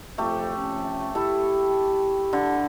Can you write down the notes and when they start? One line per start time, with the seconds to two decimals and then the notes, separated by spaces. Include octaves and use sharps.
0.18 F2 A3 G4
0.56 C3 F3 C#4
1.15 E4 G4 A4
2.33 D3